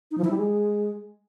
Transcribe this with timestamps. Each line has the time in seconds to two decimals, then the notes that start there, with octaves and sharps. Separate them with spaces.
0.11 D#4
0.18 F3
0.24 E4
0.31 G3
0.38 G#3